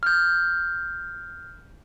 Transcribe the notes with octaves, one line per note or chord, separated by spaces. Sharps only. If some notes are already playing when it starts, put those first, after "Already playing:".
F6 G6